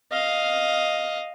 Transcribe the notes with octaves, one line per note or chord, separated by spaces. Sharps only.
D#5 F5